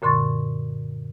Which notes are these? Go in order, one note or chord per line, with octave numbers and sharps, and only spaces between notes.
F#2 A#2 D3 C6 C#6 A6